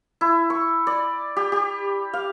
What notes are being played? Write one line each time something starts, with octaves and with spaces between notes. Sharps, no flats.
E4
C#6
D5
G4
G4
F5